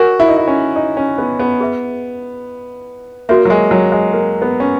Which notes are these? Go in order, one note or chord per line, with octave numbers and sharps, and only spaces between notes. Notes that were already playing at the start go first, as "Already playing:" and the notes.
Already playing: F#4 A#4 C#5 G#5
E4
D#4
E4
C#4
D#4
C#4
B3
B3
G#4 B4 E5
A#3 F#4 C#5 E5
F#3
G#3
F#3
G#3
A#3
B3
C#4